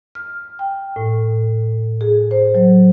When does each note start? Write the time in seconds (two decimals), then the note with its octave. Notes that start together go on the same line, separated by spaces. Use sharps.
0.15 F6
0.59 G5
0.96 A2
2.01 G#4
2.31 C5
2.55 F#3